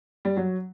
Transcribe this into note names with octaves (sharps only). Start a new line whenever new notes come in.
G3
F#3